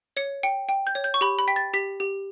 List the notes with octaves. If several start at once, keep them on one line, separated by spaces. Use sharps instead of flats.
C#5 C#7
G5 C#7
G5
G6
C#5
G6
C#6
G4 B5
B5
G5 B6
A6
G4 B6
G4